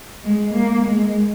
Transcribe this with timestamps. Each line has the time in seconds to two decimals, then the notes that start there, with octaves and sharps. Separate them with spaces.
0.23 G#3
0.54 A#3
0.85 G#3